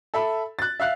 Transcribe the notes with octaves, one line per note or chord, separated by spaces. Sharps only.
A4 E5 B5
F#6 A6
E5 F5 F#6